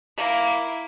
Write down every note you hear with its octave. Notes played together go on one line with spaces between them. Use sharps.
A#3 E4